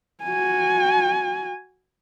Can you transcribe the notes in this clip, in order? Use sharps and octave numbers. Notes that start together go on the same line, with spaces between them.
F#4 G#5